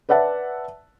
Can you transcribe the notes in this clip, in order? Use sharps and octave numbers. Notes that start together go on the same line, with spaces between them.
B4 D5 E5 F#5 A5